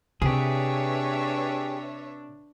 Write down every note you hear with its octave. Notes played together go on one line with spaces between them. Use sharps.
C3 D4 G4 G#4 B4 C#5 E5